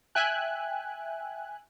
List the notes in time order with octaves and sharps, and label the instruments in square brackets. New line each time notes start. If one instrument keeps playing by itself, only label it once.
[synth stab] E5 G5 G#5 F#6